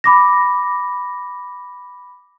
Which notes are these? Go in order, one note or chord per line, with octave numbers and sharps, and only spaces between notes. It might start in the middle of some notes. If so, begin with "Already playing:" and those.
B5 D6 A#6